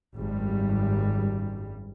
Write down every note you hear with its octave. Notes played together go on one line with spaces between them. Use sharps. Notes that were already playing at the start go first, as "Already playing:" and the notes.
G#1 F#2 G3